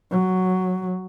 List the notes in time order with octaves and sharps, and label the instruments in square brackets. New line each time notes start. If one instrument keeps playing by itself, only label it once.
[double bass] F#3